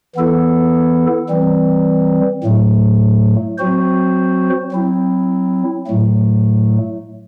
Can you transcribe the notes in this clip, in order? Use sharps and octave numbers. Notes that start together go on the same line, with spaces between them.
E3 B3 E4 A4
E3 G3 C4
A2 F#3 A3
F#3 C4 F#4 C5
F#3 C4 E4
A2 F#3 A3